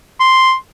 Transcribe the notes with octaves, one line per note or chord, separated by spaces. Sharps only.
C6